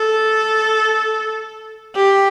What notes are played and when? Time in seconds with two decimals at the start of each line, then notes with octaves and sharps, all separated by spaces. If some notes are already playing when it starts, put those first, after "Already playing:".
Already playing: A4
1.95 G4